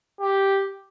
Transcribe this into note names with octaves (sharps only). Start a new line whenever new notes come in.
G4